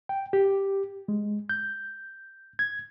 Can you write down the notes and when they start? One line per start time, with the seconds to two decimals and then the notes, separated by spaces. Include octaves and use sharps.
0.09 G5
0.33 G4
1.08 G#3
1.49 G6
2.59 G#6